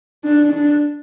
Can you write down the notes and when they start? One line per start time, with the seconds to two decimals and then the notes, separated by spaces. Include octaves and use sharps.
0.24 D4
0.52 D4